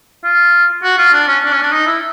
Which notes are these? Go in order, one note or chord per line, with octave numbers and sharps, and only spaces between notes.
F4
F#4
F4
D4
C#4
D4
C#4
D4
D#4
E4